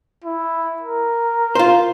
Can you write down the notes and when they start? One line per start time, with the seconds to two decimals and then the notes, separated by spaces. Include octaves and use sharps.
0.24 E4
0.82 A#4
1.55 F4 C5